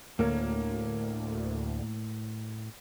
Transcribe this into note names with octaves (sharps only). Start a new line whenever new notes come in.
D2 A2 A#3 A#4 C#5